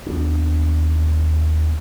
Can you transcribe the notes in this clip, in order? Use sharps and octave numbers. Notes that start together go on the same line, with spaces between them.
D#2 B3 D4